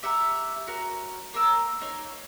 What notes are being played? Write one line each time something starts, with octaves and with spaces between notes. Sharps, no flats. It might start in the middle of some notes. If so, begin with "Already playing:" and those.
G4 E5 F#5 A#5
F#4 A#4 C#5 E6
A#3 A#4 E6
A#3 D#4 C#5